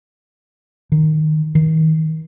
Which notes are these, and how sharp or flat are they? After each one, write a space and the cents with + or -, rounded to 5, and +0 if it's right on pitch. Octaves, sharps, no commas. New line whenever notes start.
D#3 -5
D#3 +35